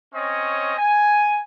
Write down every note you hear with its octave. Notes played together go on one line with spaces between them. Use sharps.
C4 C#4 C#5 D#5
G#5